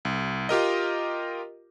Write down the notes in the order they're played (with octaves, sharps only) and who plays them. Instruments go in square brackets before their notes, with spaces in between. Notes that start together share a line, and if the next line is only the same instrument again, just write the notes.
[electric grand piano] C2
F4 G4 A#4 D#5